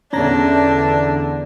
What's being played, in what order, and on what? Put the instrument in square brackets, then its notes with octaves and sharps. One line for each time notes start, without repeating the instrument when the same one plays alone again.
[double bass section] E2 D3 [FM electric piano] C#4 A#5 A#6 [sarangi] D4